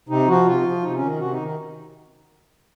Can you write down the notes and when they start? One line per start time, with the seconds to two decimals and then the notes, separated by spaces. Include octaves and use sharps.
0.09 C3 D#4
0.27 F3 F#4
0.46 C3 F4
0.64 F3
0.82 C3 D#4
0.95 C#4
1.01 D#3
1.19 C3 F#4
1.31 D#4
1.37 D#3